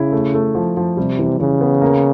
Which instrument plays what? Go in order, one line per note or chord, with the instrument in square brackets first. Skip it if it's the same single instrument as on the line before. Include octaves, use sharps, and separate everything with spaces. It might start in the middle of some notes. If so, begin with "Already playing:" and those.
Already playing: [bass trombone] C#3 [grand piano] E4
[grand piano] A3
A3
F3
F3
[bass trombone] C3 [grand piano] G3
[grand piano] E3
[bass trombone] C#3 [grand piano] E3
[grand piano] B3
A#3